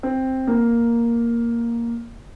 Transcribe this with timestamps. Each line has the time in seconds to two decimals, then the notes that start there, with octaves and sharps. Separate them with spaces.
0.03 C4
0.48 A#3